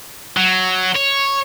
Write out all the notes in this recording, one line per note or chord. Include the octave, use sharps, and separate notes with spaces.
F#3
C#5